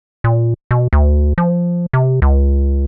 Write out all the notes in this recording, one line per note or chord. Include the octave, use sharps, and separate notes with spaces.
A#2
B2
D2
F3
C3
C#2